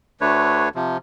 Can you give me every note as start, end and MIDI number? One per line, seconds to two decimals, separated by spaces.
0.21 0.69 38
0.21 0.69 50
0.21 0.69 57
0.21 0.69 62
0.21 0.69 71
0.21 0.69 73
0.75 0.97 48
0.75 0.97 53